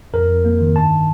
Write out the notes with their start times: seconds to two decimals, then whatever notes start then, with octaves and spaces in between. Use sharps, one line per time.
0.13 F2 A#4
0.29 F2
0.45 A#3
0.60 D#3
0.75 G2 A5